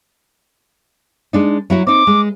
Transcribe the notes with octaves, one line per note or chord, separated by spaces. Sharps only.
G#3 D4 D#4
F#3 E4 F#4
C4 D#4 D6
G#3